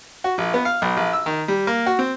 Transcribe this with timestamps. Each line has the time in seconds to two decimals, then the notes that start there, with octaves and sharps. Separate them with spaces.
0.24 F#4
0.38 A#1
0.54 B3
0.65 F5
0.82 B1
0.97 A#1
1.13 E6
1.26 D#3
1.48 G3
1.67 A#3
1.86 F#4
1.99 C4